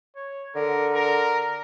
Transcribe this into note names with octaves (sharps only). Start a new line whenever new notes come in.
C#5
D3 A#4
A#4